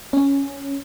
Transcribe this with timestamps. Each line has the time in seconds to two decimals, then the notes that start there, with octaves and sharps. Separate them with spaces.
0.13 C#4